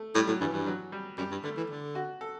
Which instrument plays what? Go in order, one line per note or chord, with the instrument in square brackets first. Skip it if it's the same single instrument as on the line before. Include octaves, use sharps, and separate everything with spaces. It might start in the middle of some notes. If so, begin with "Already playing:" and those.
Already playing: [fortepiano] A3
[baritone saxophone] A2 [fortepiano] G3
[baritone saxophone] A2 [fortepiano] F#3
[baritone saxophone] G2 [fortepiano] E3
[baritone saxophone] G2 [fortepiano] E3
[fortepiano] F#3
G3
[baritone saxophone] F#2 [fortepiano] G3
[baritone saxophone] G2
[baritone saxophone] D3 [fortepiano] A3
[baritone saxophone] E3
D3
[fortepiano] F#4
A4